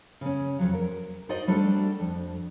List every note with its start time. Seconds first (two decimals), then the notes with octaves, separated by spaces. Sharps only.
0.21 C#3 C#4
0.59 F2 F#3
0.73 A#4
1.29 D#4 F#4 C5 D5 D#5
1.48 G3 A3 D4 F#4 A4
2.00 F2